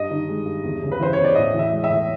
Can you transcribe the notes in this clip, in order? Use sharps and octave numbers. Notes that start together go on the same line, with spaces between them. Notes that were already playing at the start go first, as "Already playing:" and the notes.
Already playing: G2 D#5
D#3
G#3
G2
E2
C#3
B4
E3 C5
E2 C#5
D5
A2 D#5
E3
E5
G#3
E5
A2